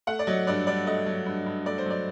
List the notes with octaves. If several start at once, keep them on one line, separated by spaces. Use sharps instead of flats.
A3 F#5
D5
F#3 D#5
G2 D5
G2 D5
A3 D#5
F#3
G2
G2
A3 D5
C5
F#3 D5